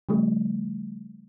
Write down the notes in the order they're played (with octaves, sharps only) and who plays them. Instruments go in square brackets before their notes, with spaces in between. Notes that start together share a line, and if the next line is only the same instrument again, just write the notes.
[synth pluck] C#3 F3 G3 A3